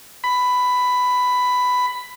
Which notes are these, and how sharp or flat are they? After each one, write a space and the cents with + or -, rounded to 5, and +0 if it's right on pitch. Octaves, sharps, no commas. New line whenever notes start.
B5 +10